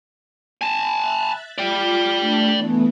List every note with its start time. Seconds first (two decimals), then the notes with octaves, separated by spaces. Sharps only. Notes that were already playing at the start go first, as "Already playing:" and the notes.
0.61 G#5 A5
0.96 E5 F#6 A6
1.58 F4 D5 G5 D6
2.19 A3 D4 A4
2.55 E3 A3 B3